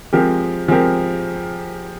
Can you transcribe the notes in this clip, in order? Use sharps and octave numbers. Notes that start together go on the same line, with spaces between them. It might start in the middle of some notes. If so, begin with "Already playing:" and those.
F3 G#3 C4 G4 A#4
F3 G#3 C4 G4 A#4